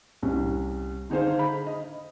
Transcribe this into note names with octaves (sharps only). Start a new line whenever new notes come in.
C2 C#4
D3 D#4 G#4 C5 F5
B5
D#5